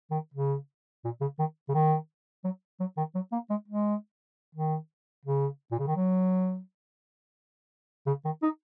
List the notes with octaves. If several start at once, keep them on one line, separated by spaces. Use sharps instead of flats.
D#3
C#3
A#2
C#3
D#3
C#3
D#3
F#3
F#3
D#3
F#3
A#3
G#3
G#3
D#3
C#3
A#2
C#3
D#3
F#3
C#3
D#3
D#4